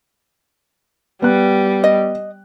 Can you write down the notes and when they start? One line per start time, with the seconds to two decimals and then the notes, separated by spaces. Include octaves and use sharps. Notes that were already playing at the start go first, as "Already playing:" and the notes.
1.22 G3 B3 F#6
1.84 D#5